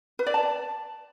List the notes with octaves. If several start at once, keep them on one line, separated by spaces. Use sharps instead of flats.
B4
D5
A5